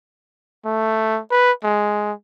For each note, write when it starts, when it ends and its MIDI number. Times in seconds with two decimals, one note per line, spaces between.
0.65 1.20 57
1.31 1.51 71
1.63 2.13 56